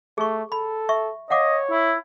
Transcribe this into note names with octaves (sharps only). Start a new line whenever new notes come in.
A3 G#4 C#6
A4 B5
E5 C#6
C#5 D#5 F5 F#5 D6
E4